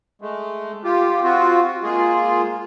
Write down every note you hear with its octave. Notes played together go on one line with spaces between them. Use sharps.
G#3 A3
F4 G4
C4 F4 F#4
G#3 A#3 F4 G#4